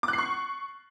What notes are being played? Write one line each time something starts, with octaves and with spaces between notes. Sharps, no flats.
D6
F#6
C7
C#6